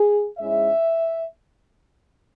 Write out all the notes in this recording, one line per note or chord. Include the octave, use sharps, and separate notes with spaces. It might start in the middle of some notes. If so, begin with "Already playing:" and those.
Already playing: G#4
G#2 G#3 C#4 E4 E5